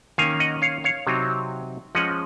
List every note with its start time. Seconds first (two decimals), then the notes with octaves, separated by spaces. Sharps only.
0.18 D#3 A#3 C#4 F5 G#5
0.40 D#5 F#5
0.62 C#5 F5
0.84 C#5 F5
1.07 C3 F#3 C4 D#4
1.95 F3 G#3 C#4 D#5 F#5